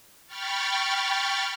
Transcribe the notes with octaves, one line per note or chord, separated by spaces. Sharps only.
G5 B5 C#6 F6 A6